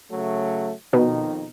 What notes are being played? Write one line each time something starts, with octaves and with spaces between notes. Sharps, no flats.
C#3 F#3 A3
F2 B2 D#3 D#4